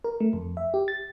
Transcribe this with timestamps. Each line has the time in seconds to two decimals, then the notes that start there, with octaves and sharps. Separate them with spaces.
0.04 A#4
0.20 A3
0.33 F2
0.57 E5
0.74 G4
0.88 A6